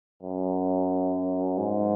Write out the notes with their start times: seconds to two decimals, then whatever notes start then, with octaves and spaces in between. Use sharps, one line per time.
0.23 F#2
1.58 G#2